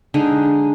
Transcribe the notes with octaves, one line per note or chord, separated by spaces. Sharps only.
D3 G#3 D#4